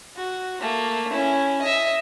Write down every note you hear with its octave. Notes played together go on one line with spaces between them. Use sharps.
F#4
A3 A#3
C#4 E4
D#5 E5